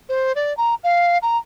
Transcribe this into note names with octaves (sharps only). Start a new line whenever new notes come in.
C5
D5
A#5
F5
A#5